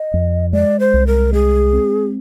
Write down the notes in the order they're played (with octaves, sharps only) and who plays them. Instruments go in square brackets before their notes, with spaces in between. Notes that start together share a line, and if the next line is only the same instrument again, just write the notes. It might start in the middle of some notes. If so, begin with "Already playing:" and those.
Already playing: [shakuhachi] D#5
[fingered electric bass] F2
[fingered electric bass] G#3 [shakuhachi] D5
[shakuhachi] C5
[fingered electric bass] C2
[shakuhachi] A#4
[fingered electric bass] G#3 [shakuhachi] G#4
[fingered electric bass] C4